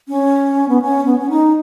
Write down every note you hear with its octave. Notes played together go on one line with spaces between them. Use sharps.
C#4
B3
C#4
B3
C#4
D#4